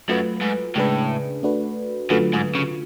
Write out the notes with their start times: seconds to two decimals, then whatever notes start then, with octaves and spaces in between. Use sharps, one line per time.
0.08 F#2 F#3 A3 F4 B4
0.42 G#2
0.76 A2 C#3 G#3 D4 G#4 B4
1.43 A3 D4 F#4 B4
2.10 F#2 D3 F#3 A3 F4 B4
2.33 G#2
2.55 C#3